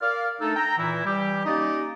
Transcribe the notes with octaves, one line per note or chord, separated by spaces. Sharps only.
A#4 D5 F5
A3 D4 D#4 A4
G5 A#5
A#2 E3 E4
E3 G3 G4
A#3 C#4 D#4 G4 D5 D#5